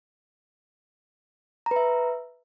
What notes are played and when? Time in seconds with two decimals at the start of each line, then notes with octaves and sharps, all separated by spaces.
1.66 A#5
1.71 B4
1.76 E5